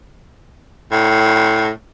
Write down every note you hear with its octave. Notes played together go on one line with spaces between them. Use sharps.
A2